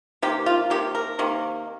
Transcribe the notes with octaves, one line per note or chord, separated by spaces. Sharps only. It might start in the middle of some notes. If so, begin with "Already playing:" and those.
C3 D#3 A#3 G4
F4
C3 D#3 A#3 G4
A#4
C3 D#3 A#3